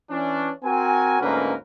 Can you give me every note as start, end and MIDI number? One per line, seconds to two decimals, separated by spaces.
0.10 0.50 52
0.10 0.50 61
0.10 0.50 62
0.64 1.18 60
0.64 1.18 66
0.64 1.18 70
0.64 1.18 80
1.21 1.54 38
1.21 1.54 44
1.21 1.54 58
1.21 1.54 61
1.21 1.54 70
1.21 1.54 71